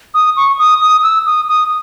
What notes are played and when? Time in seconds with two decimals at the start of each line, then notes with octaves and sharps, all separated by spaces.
0.14 D#6
0.37 C#6
0.59 D#6
0.81 D#6
1.03 E6
1.26 D#6
1.48 D#6